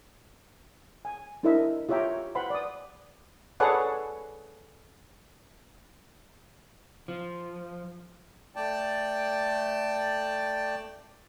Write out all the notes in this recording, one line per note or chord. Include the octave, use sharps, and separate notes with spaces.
G#5
D4 E4 A#4 C5 D#5 E5
F4 G4 C#5 E5 G5 A#5
B4 C5 F#5 G5 B5 C6
D5 D#6
G#4 A4 B4 C#5 D5 F#5
F3
A3 D5 G5 A5